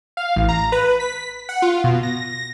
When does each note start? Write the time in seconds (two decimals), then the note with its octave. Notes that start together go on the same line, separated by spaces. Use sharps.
0.17 F5
0.36 A1
0.49 A#5
0.72 B4
1.00 B6
1.49 F#5
1.62 F4
1.84 B2
2.03 A#6